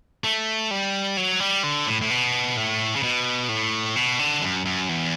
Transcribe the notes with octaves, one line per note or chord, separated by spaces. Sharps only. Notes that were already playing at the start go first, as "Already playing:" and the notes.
A3
G3
F#3
G3
D3
A2
A2
B2
A2
C#3
B2
A2
B2
D3
F#2
F#2
E2